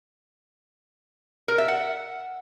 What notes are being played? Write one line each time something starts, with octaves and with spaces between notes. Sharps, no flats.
A#4
E5
F#5